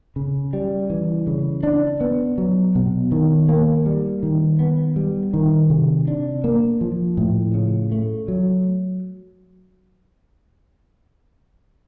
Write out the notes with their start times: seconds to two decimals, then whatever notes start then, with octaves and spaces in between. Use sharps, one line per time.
0.16 C#3
0.53 G3
0.90 E3
1.27 C#3
1.63 D4
2.01 B3
2.38 F#3
2.75 B2
3.12 D#3
3.49 A#3
3.86 G3
4.23 D#3
4.59 B3
4.96 G3
5.34 D#3
5.70 C3
6.08 D4
6.44 A#3
6.81 F3
7.17 A2
7.54 C#3
7.92 A3
8.28 F#3